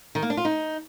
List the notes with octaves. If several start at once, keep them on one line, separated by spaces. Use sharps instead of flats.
D#3
A#3
D4
F4
D#4